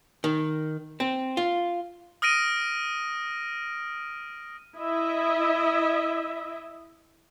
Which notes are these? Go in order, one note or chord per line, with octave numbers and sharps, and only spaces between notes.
D#3
C4
F4
D#6 F6 A#6 D7 D#7
E4 D#5 E5